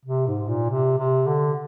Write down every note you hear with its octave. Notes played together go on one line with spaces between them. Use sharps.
C3
G#2
A#2
C3
C3
D3